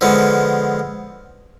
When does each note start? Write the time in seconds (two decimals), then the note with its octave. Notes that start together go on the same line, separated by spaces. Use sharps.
0.01 D3 F3 G#3 B3